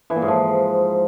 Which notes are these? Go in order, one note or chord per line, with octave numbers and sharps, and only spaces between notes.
E3
A#2
G#2
F3